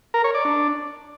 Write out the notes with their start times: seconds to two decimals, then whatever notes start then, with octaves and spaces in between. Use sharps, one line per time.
0.14 A#4
0.24 C#5
0.34 D5
0.45 D4